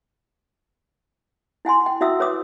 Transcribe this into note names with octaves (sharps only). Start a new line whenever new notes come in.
E4 F#5 G#5 C6
G5
E4 F#4 E5 F#5 D#6 E6
B4 C#5 D6 D#6